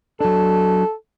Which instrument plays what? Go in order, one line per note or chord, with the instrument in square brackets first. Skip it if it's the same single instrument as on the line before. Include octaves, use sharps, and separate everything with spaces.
[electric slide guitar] F#3 D4 [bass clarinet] A4